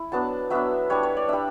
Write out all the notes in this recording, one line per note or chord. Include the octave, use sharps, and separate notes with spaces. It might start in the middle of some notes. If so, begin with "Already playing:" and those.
Already playing: E4
F#3 B3 D4 A5
F#3 B3 D4 E5
G3 D4 C#5
C#5
D5
G3 D4 E5